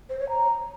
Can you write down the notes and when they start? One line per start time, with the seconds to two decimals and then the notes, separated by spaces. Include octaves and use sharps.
0.09 C5
0.19 C#5
0.29 A#5